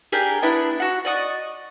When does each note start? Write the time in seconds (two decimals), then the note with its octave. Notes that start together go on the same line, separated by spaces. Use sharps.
0.12 D4 G4 G#4 A#4
0.42 B3 D4 E4
0.80 F#4 F#5
1.05 D5 D#5 F#5 C#6